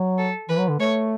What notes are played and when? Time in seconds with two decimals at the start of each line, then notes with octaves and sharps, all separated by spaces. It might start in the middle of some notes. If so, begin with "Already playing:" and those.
Already playing: F#3
0.18 A4
0.49 E3 B4
0.59 F#3
0.69 D3
0.80 A3 C#5